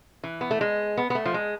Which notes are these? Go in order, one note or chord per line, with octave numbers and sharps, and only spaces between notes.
E3
B3
A3
G#3
B3
B3
A3
F3
G#3